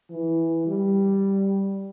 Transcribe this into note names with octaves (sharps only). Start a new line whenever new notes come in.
E3
G3